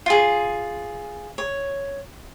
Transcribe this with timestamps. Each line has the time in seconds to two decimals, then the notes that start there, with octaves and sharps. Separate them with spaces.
0.06 F4 G#4
1.38 C#5